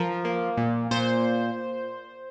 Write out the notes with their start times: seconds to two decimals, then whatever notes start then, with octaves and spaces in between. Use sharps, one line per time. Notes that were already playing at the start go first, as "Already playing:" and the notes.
Already playing: F3 A#4
0.25 A#3
0.57 A#2
0.91 A#2 C5